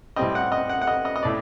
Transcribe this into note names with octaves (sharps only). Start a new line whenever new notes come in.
A2 G3 C4 D#5
F#5
D#5
F#5
F#5
D#5
D#5
D#5
A2 A3 D5